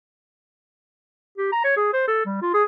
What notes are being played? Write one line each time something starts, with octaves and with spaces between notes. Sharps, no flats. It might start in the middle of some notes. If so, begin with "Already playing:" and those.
G4
A#5
C#5
G#4
C5
A4
G3
F4
G#4